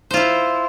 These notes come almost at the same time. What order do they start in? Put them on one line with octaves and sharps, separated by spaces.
C5 F4 E4